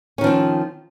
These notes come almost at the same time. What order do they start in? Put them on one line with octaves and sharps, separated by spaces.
C#4 D#3 F3 C4